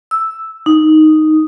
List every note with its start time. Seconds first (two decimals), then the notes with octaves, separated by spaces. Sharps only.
0.11 E6
0.66 D#4